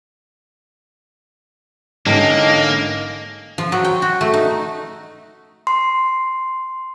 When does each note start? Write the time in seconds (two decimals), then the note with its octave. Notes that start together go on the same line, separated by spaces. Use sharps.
2.06 A1 G#2 D3 A#3 C#4 D#5 G5
3.58 F3
3.72 F#3
3.84 G5
4.02 F#4
4.21 A3
4.33 D#4
5.67 C6